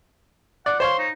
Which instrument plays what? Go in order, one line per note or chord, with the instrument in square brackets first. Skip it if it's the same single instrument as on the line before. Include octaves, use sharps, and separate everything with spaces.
[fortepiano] D5 [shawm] F#5
[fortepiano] C5 C#5 F5 [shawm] C6
[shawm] D#4